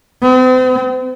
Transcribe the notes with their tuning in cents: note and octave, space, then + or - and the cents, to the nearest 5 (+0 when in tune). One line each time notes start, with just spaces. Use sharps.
C4 -40